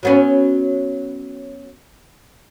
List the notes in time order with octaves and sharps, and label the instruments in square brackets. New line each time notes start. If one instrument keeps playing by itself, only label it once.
[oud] F#3 B3 C#4